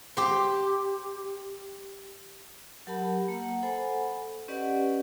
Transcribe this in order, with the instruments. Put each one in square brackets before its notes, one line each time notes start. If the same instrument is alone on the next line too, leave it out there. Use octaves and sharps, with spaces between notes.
[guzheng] G4 C5
[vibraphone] F#3 G4 A#4 F#5 A5 B5
A#3 F#5
A4 C5 F#5 G#5 B5
C#4 G4 B4 D5 D#5 F#5